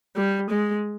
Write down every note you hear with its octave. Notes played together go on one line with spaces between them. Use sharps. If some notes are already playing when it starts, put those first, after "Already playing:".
G3
G#3